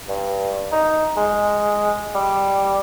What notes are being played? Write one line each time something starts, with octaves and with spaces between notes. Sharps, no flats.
G2
D#4
G#3
G3